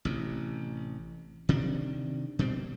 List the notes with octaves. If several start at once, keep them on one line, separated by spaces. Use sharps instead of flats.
A1 C3
C3 D#3 D4
B2 G3 C4